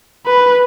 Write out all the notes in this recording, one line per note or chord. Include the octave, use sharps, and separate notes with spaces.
B4